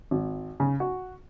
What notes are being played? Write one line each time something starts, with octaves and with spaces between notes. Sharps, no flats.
G#1
C#3
F#4